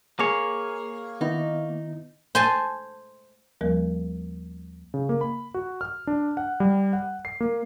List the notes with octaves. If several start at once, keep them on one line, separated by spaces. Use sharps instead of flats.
A#3 G#4 C#5
D#3 B3 D#4 E4
C5 G#5 A5
D#2 F3 G3 A#3 A#4
C#3
A#3
B5
F#4
F6
D4
F#5
G3
F#5
C7
A#3